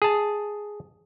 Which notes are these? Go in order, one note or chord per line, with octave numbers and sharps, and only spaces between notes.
G#4 A5